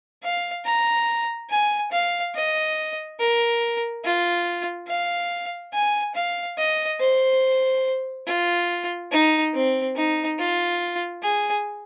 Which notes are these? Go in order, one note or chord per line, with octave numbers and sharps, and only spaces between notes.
F5
A#5
G#5
F5
D#5
A#4
F4
F5
G#5
F5
D#5
C5
F4
D#4
C4
D#4
F4
G#4